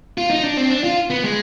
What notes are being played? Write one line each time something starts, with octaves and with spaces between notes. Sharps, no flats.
F4
D#4
D4
C4
D4
F4
B3
G#3